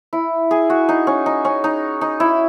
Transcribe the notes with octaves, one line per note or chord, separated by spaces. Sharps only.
E4
G#4
F#4
D#4
C#4
D#4
C#4
D#4
D#4
E4